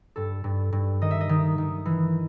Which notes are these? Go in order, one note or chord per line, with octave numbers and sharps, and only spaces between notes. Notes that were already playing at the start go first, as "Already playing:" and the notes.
G2 A4
G2
G2
D#3 D#5
E5
D#5
D#3
D#3
E3